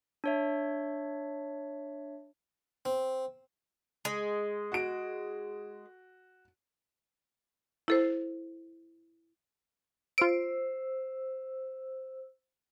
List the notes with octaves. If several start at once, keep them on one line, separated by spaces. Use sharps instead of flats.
D4 C#5 E5
C4
G#3
F#4 D7
E4 A4 C5
F4 C5 E6 D7